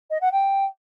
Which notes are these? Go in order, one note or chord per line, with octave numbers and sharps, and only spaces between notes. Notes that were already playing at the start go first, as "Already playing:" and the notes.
D#5
F#5
G5